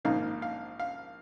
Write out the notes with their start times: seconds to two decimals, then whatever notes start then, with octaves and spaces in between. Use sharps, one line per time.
0.05 A#1 G#2 D#3 A#3 D#4 F5
0.42 F5
0.80 F5